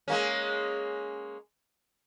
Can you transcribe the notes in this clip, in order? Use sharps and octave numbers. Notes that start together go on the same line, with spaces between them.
G#3 A#3 C#4